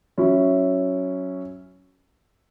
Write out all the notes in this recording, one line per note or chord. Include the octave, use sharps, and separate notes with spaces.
F#3 C#4 E4